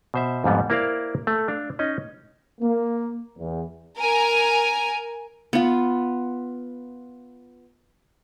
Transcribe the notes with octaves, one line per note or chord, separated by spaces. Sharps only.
B2 C5 E5
F2 G#2 G3 B3
A#3 E4 A#4 C5 D5 F5
A3
D4 F5
C#4 D#4 D#5
A#3
E2
A#4 G#5
B3 F4